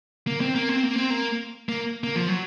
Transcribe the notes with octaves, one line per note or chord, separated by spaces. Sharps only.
A#3
C4
A#3
C4
A#3
C4
A#3
A#3
A#3
F3
F#3